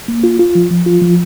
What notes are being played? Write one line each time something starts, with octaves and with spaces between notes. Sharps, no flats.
A#3
F4
F4
F3
F3
F4
F3